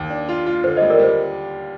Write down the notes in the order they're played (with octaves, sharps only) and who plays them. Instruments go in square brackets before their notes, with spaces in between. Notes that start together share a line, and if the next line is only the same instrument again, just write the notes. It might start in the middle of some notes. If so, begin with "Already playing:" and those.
Already playing: [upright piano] D#2
D4
F4
F4
[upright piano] D3 [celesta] C5
[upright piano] G3 [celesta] C5 D#5
[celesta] A#4 D5
[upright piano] G3 [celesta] C5